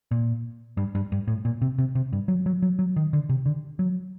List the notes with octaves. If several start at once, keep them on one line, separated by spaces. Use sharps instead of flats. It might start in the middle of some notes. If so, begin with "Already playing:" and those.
A#2
G2
G2
G2
A2
A#2
C3
C3
C3
G2
F#3
F#3
F#3
F#3
D#3
D3
C3
D3
F#3